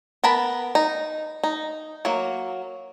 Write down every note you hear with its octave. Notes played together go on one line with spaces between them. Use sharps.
B3 A#4 A5 B5
D#4
D#4
F#3 A#3